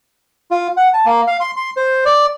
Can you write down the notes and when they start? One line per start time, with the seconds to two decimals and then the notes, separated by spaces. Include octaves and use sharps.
0.51 F4
0.77 F#5
0.93 A5
1.06 A#3
1.27 F5
1.40 C6
1.56 C6
1.77 C5
2.05 D5